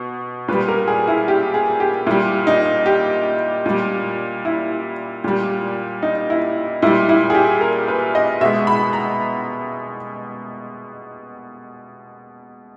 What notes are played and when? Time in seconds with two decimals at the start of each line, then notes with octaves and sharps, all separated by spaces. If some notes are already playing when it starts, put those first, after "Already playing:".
Already playing: B2
0.48 A#2 B4
0.52 G3
0.68 A#4
0.88 G#4
1.08 E4
1.28 G4
1.54 G#4
1.80 G4
2.06 A#2 G3 E4
2.47 D#4
2.86 G4
3.66 A#2 G3
4.45 E4
5.24 A#2 G3
6.02 D#4
6.30 E4
6.82 A#2 E4
6.86 G3
7.09 E4
7.30 G#4
7.35 G4
7.61 A#4
7.88 B4
8.15 D#5
8.41 B2 E5
8.45 G#3
8.67 B5
8.93 A#5